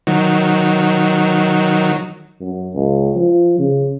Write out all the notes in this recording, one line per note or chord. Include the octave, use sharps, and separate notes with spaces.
D#3 F#3
F#2
C#2
F3
C#3